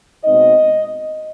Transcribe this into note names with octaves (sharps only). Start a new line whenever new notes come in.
B2 G#3 C4 D#4 D#5